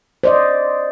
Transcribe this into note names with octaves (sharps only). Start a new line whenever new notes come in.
C5 D5 D#5